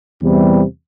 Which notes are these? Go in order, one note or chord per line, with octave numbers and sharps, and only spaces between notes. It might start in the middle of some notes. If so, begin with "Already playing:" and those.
E2 C3 E3 G3